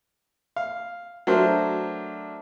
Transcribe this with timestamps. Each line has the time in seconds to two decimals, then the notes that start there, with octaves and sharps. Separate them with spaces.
0.56 F5
1.27 F#3 A3 D4 A#4 C5